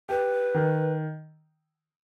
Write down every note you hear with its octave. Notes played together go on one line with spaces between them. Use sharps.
G4 B4
D#3